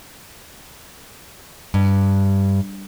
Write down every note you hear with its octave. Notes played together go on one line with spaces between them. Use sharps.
G2